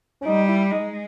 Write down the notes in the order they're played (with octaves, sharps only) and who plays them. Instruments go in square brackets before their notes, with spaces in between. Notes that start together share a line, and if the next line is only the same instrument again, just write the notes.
[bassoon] C#4
[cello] G3 [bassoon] D#4
[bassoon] E4
[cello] G#3 [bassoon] D#4